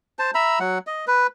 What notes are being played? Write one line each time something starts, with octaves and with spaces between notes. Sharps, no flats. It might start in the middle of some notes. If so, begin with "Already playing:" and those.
C5 A5
E5 A#5 B5 E6
F#3 F#5
D#5
B4